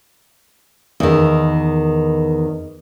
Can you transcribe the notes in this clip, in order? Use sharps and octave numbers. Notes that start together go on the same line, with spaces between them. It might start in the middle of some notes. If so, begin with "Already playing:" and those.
E2 D#3